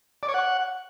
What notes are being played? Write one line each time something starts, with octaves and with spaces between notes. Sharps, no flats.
D5
C#5
F#5